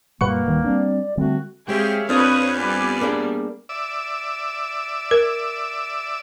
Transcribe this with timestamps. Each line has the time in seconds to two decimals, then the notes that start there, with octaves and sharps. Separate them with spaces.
0.21 F#2 A#2 G3 A#3 B4 F#5 C#6
0.47 D1 D#3 G3
0.64 G3 C4 D4 D5
1.17 D3 G3 A3 C4 F#4
1.69 G#3 C4 G4 G#4 C#5 E5 F5 G#5
2.09 F2 C4 D4 F4 B4 C#5 F5 D#6
2.58 G3 B3 B4 D5 G#5
3.01 A#3 D4 G#4
3.69 D5 E5
5.11 A#4